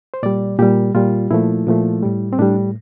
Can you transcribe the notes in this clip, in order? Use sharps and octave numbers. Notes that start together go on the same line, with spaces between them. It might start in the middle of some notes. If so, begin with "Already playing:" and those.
C5
A#2 G3 D5
A#2 G3 G4
A#2 G3 F4
A#2 F3 A3 E4
A#2 F3 A3
A2 G3
C4
A2 G3 D4